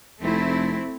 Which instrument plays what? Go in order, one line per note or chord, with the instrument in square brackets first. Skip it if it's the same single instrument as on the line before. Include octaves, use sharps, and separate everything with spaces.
[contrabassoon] F1 [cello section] A3 C4 E4